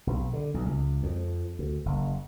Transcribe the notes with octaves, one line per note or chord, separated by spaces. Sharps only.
B1
D3
B1
C#2
F2
D2
F#1